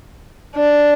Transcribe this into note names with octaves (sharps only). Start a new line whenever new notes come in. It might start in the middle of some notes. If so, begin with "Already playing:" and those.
D4